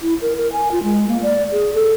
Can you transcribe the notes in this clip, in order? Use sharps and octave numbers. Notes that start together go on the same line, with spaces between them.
E4
A#4
A#4
G#5
F4
G#3
A#3
D5
G#4
A4